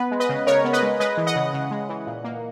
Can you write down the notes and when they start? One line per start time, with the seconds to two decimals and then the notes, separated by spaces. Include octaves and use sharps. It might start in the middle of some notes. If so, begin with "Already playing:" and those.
Already playing: B3 B4
0.11 G#3
0.20 B4 D#5
0.29 C#3
0.47 C#3 A#4 C#5
0.64 B3
0.73 B4 D#5
0.83 G#3
1.00 G#3 B4 D#5
1.17 E3
1.27 D#5 F#5
1.36 C#3
1.53 C#3
1.71 G#3
1.89 E3
2.07 A#2
2.24 A#3